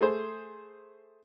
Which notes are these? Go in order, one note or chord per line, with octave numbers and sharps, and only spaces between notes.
A3 G#4 C5